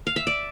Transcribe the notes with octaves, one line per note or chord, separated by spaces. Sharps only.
F5
E5
D5